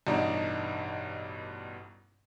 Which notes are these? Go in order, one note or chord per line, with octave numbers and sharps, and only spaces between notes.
A1 G2 B2 D4 D#4 A#5